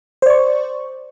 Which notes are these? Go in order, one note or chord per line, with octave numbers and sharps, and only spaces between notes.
C5 D5 C#6